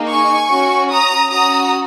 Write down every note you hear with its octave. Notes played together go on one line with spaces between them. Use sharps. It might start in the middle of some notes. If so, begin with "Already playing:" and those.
Already playing: A#3 D#4 G#4
G#5 C#6
C#4 F#4
A#5 D#6
C#4 F#4 A#5 D#6